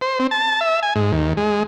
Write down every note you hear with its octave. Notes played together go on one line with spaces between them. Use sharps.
C5
C4
A5
E5
G#5
G#2
D#2
G#3